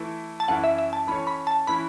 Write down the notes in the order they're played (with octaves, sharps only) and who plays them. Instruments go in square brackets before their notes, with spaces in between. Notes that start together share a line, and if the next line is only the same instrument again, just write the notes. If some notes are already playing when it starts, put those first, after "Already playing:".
Already playing: [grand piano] E3 A3 E4
[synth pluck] A5
[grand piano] F#2 E3 C#4 E4 A4 [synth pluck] F#5
[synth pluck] E5
E5
A5
[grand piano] E3 C#4 A4 C#5 [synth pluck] B5
[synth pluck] B5
A5
[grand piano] E3 C#4 E4 B4 [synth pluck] B5